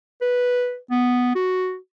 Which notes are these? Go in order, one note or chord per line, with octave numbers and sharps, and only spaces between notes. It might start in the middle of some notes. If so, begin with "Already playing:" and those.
B4
B3
F#4